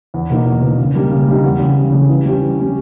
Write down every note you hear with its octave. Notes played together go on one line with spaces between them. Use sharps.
E2
B2 A#3 D#4
E2
B2 A#3 D#4
C#3
G3 A#3 D#4
C#3
G3 A#3 D#4
E2
C#3 G3
E2
C#3 G3
E3
G3 C#4 G4
E3
G3 C#4 G4